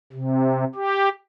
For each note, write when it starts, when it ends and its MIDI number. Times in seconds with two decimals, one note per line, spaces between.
0.13 0.64 48
0.75 1.09 67